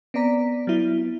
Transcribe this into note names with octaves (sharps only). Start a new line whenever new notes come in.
B3 C4 D5 A#5 B6
F#3 B3 E4